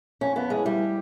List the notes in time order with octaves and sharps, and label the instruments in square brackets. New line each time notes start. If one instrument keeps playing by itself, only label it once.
[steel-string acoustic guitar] F2 C#4
F2 B3
E3 G#3
F2 G3